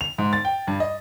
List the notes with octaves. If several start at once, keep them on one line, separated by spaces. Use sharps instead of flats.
F7
G#2
A6
G5
G2
D#5